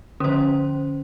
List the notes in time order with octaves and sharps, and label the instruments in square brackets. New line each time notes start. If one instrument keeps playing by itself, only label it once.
[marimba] D3 F3 [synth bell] C#4 C5